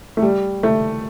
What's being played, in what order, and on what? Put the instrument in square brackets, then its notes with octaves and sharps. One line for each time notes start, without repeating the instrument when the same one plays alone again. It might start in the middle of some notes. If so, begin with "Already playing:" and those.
[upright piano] A3
G3
A3